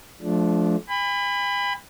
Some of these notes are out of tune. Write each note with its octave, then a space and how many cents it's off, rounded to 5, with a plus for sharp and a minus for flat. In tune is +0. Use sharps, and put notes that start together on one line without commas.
F3 +0 A3 -35 D4 -10
G#5 -45 B5 +15